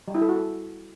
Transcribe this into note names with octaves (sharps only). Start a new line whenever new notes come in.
G3
E4
A4
F#4
A4